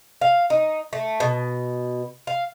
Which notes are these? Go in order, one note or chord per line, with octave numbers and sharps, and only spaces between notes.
F5
D#4
A3
B2
F5